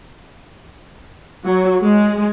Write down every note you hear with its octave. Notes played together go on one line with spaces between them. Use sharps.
F#3
G#3